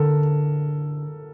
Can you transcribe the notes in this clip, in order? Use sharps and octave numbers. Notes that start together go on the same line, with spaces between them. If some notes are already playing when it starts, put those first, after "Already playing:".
Already playing: D3 A4 A#4